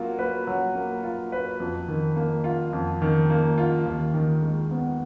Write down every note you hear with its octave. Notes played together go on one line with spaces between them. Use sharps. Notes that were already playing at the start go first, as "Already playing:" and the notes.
Already playing: F#3 A#3 F4
B4
F#3
A#3
F4
B4
F2
D#3
A#3
F4
F2
D#3
A#3
F4
D#2
D#3
G#3
B3